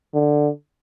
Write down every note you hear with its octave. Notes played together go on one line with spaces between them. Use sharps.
D3